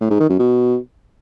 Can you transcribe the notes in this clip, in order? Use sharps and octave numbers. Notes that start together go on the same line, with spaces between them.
A2
G#2
D#3
F#2
B2